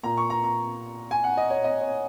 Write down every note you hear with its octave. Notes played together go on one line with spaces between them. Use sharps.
A#2 A#5
C#6
A#5
A#5
G#5
F#5
D#5
C#5
D#5
C#5